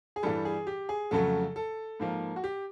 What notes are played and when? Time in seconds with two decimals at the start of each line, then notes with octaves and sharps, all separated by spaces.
0.16 G#4
0.23 G2 E3 G3 A4
0.45 G#4
0.67 G4
0.89 G#4
1.11 F2 C#3 F#3 A3 A4
1.56 A4
2.00 G#2 F3 A#3
2.36 F#4
2.44 G4